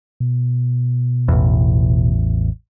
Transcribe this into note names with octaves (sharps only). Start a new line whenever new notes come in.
B2
A1 E2